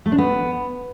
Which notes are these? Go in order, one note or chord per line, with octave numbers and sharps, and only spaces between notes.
A3
D4
B3